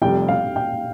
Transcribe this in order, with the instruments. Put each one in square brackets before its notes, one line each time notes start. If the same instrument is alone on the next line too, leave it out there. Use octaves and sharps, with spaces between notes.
[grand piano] F1 F2 C3 G3 [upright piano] G5
[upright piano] F5
G5